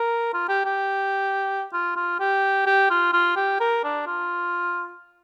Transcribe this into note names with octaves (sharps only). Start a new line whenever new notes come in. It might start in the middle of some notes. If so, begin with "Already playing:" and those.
Already playing: A#4
F4
G4
G4
F4
F4
G4
G4
F4
F4
G4
A#4
D4
F4